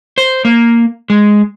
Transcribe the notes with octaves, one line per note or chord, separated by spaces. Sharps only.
C5
A#3
G#3